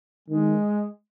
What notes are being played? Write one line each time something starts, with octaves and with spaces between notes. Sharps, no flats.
D#3 G#3